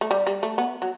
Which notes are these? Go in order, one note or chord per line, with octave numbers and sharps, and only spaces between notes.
A3
G3
G3
A3
B3
F#3